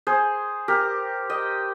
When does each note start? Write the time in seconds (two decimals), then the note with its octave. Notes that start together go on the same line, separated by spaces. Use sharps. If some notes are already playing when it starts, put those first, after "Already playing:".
0.07 G#4 C5
0.68 G4 A#4
1.30 D#5 G5